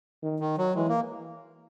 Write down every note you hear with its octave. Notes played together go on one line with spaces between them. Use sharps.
D#3
D#3
F#3
E3 G#3
A#3